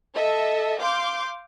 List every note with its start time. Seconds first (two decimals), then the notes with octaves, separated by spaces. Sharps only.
0.14 A4 D#5 E5
0.81 F5 C6 D6 G6